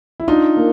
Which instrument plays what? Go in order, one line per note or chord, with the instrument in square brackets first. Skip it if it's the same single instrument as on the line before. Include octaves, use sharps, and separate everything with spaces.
[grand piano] E4
[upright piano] D4 [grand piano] D#4 F4
[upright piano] A#3